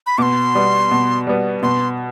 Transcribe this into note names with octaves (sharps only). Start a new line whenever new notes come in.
B5
B2 C6 D6
G3 B3
B2
G3 B3
B2 C6